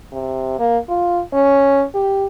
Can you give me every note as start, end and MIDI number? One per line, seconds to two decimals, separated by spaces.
0.12 0.55 48
0.59 0.78 58
0.89 1.21 65
1.33 1.84 61
1.95 2.27 67